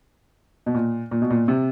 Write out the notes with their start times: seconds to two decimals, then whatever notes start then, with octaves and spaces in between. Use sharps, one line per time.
0.66 B2
0.75 A#2
1.11 A#2
1.22 B2
1.30 A#2
1.48 C3